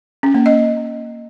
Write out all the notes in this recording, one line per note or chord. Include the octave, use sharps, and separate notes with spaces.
C#4
A#3
D#5